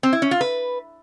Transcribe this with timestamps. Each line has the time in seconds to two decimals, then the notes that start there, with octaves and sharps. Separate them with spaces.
0.03 C4
0.13 E4
0.22 C#4
0.31 F4
0.41 B4